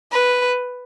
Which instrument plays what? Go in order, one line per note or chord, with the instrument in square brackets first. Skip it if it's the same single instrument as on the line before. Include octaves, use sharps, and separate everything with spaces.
[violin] B4